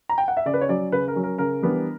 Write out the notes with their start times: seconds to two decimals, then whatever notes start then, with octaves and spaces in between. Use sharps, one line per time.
0.09 A#5
0.18 G5
0.28 F#5
0.37 E5
0.46 C#3 D5
0.54 B4
0.61 C#5
0.69 F#3 C#4 D5
0.92 C#3 B4
1.08 A#4
1.16 F#3 C#4
1.23 A#4
1.38 C#3 A#4
1.62 E3 G3 B3 D4